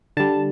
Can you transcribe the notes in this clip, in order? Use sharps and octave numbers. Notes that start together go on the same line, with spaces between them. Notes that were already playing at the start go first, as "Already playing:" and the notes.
D3 G3 A5